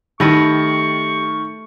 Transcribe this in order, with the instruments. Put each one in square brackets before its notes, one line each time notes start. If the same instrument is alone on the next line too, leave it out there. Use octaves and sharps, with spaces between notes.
[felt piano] D#3 [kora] A3 E4 D#5 [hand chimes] G4 A#6 [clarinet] C#6